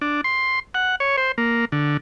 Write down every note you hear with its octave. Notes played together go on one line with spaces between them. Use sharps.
D4
C6
F#5
C#5
C5
A#3
D3